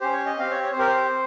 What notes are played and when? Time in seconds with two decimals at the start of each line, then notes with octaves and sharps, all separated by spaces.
0.01 C#4 G4 C5
0.12 C#5
0.26 D#5
0.38 C4 G4 F5
0.51 C#5
0.63 C#5
0.72 C5
0.76 C4 G4 A#4
0.87 C5